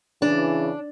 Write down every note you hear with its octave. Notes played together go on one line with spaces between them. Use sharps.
C#3 E3 D4